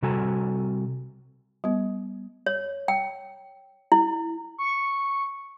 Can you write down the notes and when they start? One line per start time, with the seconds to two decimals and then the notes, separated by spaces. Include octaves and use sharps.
0.02 C3 G3 F#4 A4 G#5 A#5
1.64 G3 B3
2.46 C#5
2.88 G5
3.92 E4
4.58 C#6